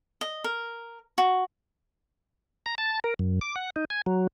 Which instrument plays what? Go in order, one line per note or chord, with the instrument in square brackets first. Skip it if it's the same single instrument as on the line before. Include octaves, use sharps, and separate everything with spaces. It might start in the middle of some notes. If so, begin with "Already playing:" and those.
[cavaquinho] D#5
A#4
F#4
[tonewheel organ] A#5
A5
A#4
F#2
D6
F#5
D#4
G#5
F#3